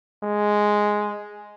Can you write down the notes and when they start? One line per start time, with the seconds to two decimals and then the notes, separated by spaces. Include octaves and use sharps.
0.23 G#3